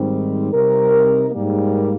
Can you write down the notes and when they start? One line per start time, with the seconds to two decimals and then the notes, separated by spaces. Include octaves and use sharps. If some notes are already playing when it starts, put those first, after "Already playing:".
Already playing: G#2 D#3 G3 C4
0.53 C3 G3 C4 D#4 A#4
1.31 G#2 G3 A#3